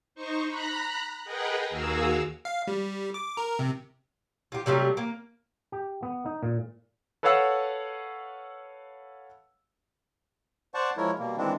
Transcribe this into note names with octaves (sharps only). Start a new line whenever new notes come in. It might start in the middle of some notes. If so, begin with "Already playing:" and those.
D#4 C5 C#6
A#5 B5 F#6
G#4 A#4 B4 D#5 F#5 G5
D#2 F#4 G#4 A#4 F5 E6
F5
G3
D6
A#4
C3
F4 G4
C3 F#3 G3 A3
A#3
G4
B3
D#4
A#2
A4 B4 C#5 F5 F#5 E6
C5 D5 F#5 A5 C#6
F3 G#3 E4 A#4 C#5
B2 G3 A#3
D#3 E3 G#3 C4 D4